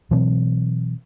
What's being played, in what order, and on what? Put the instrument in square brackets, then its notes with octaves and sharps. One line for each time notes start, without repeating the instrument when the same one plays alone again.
[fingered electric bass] B2 E3 F#3 C4